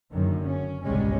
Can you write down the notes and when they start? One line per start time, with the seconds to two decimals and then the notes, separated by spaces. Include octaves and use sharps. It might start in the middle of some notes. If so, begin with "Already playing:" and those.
0.12 F#1 F#2 D3 D#3
0.47 C#4
0.85 G#1 C#2 B2 G3 G#3 C#4